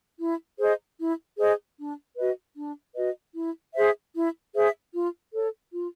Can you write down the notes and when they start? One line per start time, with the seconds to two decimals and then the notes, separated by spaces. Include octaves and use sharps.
0.19 E4
0.59 G#4 C5 D#5
0.99 E4
1.38 G#4 C5 D#5
1.77 D4
2.17 F#4 B4 D#5
2.56 D4
2.96 F#4 B4 D#5
3.35 E4
3.75 G#4 C5 E5
4.14 E4
4.54 G#4 C5 E5
4.93 F4
5.33 A4 C#5
5.72 F4